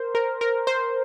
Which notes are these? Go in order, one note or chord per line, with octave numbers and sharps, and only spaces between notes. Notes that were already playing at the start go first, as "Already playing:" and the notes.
Already playing: A#4 C5
A#4
A#4
C5